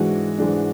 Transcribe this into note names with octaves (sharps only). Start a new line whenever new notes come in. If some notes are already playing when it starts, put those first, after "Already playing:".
Already playing: G#2 E3 G#3 D4 F#4
G#2 E3 G#3 D4